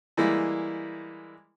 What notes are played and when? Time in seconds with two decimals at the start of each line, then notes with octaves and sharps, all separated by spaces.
0.17 E3 G3 G#3 A#3 E4